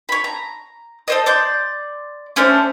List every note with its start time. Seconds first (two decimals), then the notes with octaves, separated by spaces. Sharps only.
0.09 C#5 B5
0.24 A#5
1.08 A4 C5 D#5
1.26 D5 C6 G6
2.36 A3 C#4 D4 C5